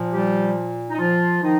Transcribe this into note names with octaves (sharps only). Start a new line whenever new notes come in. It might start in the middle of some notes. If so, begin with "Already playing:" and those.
Already playing: A#2 F3
G3 G4
D#4
F3 F4
D#3 F3 D#4